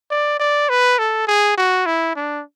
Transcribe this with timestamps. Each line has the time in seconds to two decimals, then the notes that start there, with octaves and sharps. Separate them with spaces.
0.11 D5
0.40 D5
0.69 B4
0.99 A4
1.27 G#4
1.57 F#4
1.86 E4
2.16 D4